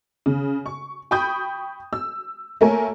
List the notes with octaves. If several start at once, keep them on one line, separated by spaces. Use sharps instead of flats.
C#3
C#6
G5 B5 C#6 D#6 G6
E6
A3 A#3 A4 A#4 C#5 G#5